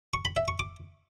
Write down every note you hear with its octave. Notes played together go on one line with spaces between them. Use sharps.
C#6
B5
E5
C#6
D6